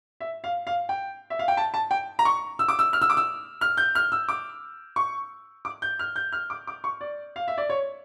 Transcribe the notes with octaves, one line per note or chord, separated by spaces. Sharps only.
E5
F5
F5
G5
E5
F5
G5
A5
A5
G5
A#5
C#6
E6
D6
E6
F6
E6
D6
E6
F6
G6
F6
E6
D6
C#6
D6
G6
F6
G6
F6
D6
D6
C#6
D5
F5
E5
D5
C#5